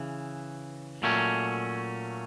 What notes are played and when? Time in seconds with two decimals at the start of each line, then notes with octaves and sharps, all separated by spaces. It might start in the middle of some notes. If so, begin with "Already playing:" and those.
Already playing: C#3 E3
1.03 A#2 F#3 A3 C#4